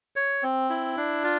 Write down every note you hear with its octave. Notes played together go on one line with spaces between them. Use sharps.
C#5
C4
E4
D4
F4